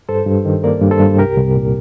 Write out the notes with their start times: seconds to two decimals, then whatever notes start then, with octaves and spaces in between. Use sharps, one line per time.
0.09 G2 A4 C5
0.27 G2
0.45 D#3
0.64 A#3 A#4 D5
0.81 G2
0.91 A4 C5
1.00 G2
1.18 C2 G4 A#4
1.37 C2
1.55 A#2